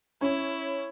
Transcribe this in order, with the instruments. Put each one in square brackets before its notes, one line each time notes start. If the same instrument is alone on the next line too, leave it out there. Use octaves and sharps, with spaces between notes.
[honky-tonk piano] C#4 [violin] E4